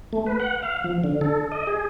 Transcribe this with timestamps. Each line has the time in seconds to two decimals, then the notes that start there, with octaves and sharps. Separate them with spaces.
0.13 A3
0.26 B4
0.40 F#5
0.63 F5
0.84 F3
1.04 D3
1.21 A4
1.52 D#5
1.67 G#4